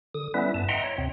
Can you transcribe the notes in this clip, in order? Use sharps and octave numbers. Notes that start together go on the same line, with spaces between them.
D3 D#6
G3 B3 C#4 E4 B4 E5
G2 A5
D#5 E5 F#5 G5 A#5 C6
C#5
D2 C3 C4